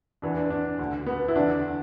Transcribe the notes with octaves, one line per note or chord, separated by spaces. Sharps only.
E2 E3 D4
D4
D4
D2 D3
B3
E4
E2 D3 D4